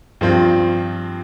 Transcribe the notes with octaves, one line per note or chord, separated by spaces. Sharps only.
G2 F3 C4 F4